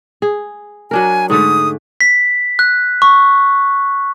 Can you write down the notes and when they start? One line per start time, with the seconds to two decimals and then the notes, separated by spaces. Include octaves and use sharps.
0.22 G#4
0.91 F#3 D4 A#4 G#5
1.30 G#2 D3 A3 D#6
2.01 B6
2.59 F#6
3.02 C#6